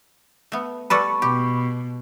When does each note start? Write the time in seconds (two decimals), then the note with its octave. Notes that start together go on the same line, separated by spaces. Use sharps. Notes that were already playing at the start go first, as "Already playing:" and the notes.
0.52 A3 B3
0.90 G3 A4 B4 B5 C#6
1.22 B2 G4